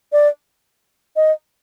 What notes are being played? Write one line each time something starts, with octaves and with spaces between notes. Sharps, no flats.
D5
D#5